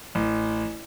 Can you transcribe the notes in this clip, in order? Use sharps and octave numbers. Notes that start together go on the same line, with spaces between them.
A1